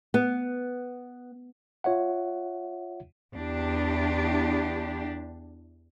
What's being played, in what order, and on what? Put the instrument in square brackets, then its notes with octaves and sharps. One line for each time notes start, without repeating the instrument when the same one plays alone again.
[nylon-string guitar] B3
[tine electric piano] F4 C#5 E5 F#5
[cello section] E2 D4 G4